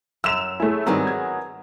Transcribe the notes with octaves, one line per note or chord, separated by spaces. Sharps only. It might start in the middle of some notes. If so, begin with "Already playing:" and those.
F#2 E6 E7 F7
A3 E4 G#4 C#5 G#5
G#2 D#3 F#3 G3 B3 C4 G#4 A#5
G#6